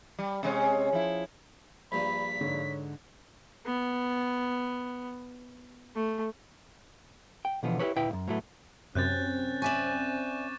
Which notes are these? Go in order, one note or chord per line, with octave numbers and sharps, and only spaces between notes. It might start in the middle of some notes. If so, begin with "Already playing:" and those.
G3
C3 G#3 C#4
F3 E4
A#1 G2 A#2 B5 B6
G#2 D3 C#5
B3
A3
G5
B2 D3 E3 F3 B3
E4 G4 A4 B4 C#5
D2 A#2 E4 B4 G5
B1 F#2
A2 F#3 A3 B3
F#2 C3 C4 C#4 F#6 G6 A6
D5 E5 G#5 C#6 D6 E7